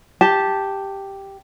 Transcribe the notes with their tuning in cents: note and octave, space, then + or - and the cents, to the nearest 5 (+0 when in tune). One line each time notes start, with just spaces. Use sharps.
G4 +0 A5 +0